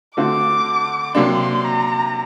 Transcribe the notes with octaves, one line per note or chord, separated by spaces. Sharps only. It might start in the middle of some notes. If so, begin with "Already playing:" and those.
D3 A3 C4 F#4 D6
C3 F#3 A#3 D4 C6
A#5